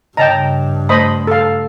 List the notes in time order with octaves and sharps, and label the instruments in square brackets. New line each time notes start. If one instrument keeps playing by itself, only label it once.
[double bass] G2 [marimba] C#3 D#5 [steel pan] G5 A5 A#5
[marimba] A3 [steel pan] C5 D#5 B5
[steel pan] A4 F5